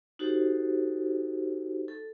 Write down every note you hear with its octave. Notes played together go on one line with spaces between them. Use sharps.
D#4 F#4 G4 A4 C5
A4